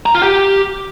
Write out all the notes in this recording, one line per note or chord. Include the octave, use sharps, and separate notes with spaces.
A#5
F4
G4